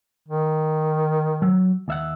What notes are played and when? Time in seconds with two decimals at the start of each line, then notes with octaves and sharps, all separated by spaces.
0.28 D#3
1.42 F#3
1.88 D#2 E5 F#5